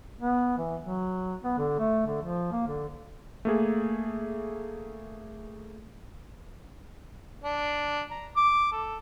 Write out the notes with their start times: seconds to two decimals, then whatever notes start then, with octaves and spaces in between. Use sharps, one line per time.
0.21 B3
0.58 E3
0.81 F#3
1.44 B3
1.58 D3
1.79 A3
2.07 D3
2.22 F3
2.51 A#3
2.67 D3
3.45 A3 A#3 G#4
7.44 D4
8.11 A#5
8.36 D6
8.72 A4